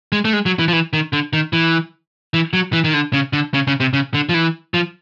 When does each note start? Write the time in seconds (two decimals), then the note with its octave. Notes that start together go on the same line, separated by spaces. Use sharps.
0.12 G#3
0.25 A3
0.33 G#3
0.46 F#3
0.59 E3
0.68 F3
0.73 E3
0.93 D#3
1.13 D3
1.33 D#3
1.53 E3
2.34 E3
2.53 F#3
2.73 E3
2.84 D#3
2.94 D3
3.13 C#3
3.33 D3
3.54 C#3
3.67 C#3
3.80 C3
3.93 C#3
4.14 D3
4.29 F3
4.34 E3
4.74 F3